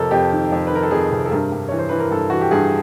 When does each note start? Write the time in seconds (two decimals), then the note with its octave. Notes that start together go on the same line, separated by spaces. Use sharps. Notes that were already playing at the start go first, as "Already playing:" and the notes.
Already playing: F2 C3 A4 A#4
0.11 F2 G4
0.32 D#3
0.52 F2
0.67 B4
0.71 D#3 A#4
0.83 A4
0.91 F2 G#4
1.12 C3
1.26 A4
1.32 G2 A#4
1.52 G2
1.68 E3 C#5
1.79 C5
1.89 E3 B4
2.00 A#4
2.11 G2 A4
2.30 E3 F#4
2.41 G4
2.51 G2 G#4